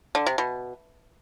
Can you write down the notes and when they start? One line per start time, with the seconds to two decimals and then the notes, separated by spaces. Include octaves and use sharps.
0.15 D3
0.26 C3
0.38 B2